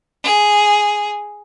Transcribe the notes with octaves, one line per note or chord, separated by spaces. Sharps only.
G#4